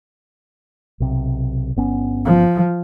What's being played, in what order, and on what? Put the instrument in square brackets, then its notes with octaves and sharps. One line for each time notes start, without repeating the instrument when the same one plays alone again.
[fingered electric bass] B1 C3
G1 B3 C#4
[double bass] F3